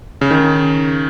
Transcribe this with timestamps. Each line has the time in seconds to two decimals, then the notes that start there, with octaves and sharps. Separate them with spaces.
0.21 C#3
0.31 D#3